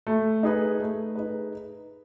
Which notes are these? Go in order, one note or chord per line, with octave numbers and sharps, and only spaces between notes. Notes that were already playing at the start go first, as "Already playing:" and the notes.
A3
D#4 G#4 B4
A3
D#4 G#4 B4